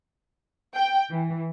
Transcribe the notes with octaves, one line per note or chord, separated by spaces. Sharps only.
G5
E3